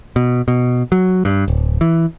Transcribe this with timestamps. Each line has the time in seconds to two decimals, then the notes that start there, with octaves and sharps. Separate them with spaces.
0.16 B2
0.48 B2
0.92 F#3
1.25 G2
1.48 D1
1.81 E3